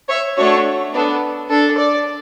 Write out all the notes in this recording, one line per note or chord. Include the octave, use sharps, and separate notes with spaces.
C#5 E5
A3 D4 F#4 C#5
B3 D4 A4 D5
D4 A4
D5